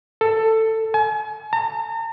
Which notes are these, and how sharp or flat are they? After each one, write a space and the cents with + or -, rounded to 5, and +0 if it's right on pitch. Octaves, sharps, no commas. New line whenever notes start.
A4 +15
G#5 +40
A#5 -45